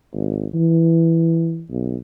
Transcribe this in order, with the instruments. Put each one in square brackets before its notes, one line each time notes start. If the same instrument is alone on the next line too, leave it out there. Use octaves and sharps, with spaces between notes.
[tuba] G#1
E3
B1